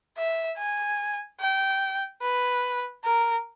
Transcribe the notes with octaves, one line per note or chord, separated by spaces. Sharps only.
E5
G#5
G5
B4
A#4